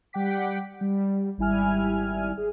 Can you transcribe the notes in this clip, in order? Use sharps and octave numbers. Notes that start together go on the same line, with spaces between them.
G3 F#5 G5 D6 B6
G3
G#1 G3 E4 G#5 F6
G#4